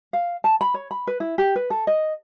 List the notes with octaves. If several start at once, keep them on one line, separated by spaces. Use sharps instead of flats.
F5
A5
B5
C#5
B5
B4
E4
G4
B4
A4
D#5